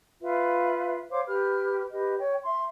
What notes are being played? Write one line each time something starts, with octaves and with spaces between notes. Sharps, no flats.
F4 B4 E5 F5
C5 C#5 F5 D6
G4 B4 F6
G4 B4 D#5
C#5 G5
E5 C6